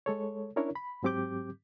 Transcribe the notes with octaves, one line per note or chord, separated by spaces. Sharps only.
G#3 A4 C#5
C#4 D4 E4 A#4 C#5
B5
G#2 F#3 C4 G4 D6 G6